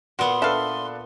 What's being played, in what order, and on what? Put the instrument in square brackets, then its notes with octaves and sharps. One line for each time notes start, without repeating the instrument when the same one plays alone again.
[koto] A#2 B3 [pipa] F#4 [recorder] C6
[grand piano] D4 A4 B4 [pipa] E5 F5